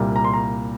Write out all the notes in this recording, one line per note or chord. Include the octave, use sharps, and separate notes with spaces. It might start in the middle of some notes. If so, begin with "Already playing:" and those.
Already playing: C2 A#2 G3 A#3
A#5
C6
A#5